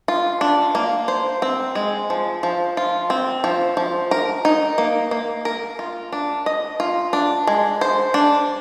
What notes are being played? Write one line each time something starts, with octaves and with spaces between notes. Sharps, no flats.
F4
D4
A#3
C5
C4
G#3
F3
F3
F4
C4
F3
F3
A#4
D#4
A#3
A#3
A#4
F4
D4
D#5
F4
D4
G#3
C5
D4